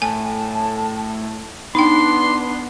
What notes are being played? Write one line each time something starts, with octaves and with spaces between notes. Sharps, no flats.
A2 G#5 A5
B3 D4 D#4 G5 C6